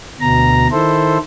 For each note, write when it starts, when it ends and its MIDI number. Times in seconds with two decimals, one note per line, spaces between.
0.21 0.68 38
0.21 0.68 47
0.21 0.68 82
0.71 1.18 51
0.71 1.18 64
0.71 1.18 69
0.71 1.18 72